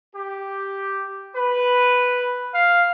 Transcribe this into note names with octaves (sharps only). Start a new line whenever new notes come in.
G4
B4
F5